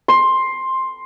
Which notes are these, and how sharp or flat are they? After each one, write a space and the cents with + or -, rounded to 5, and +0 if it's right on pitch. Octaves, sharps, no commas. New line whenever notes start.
C6 +10